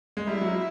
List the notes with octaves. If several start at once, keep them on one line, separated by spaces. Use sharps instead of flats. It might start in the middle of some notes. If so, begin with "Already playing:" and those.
G#3
G3 E4
F#3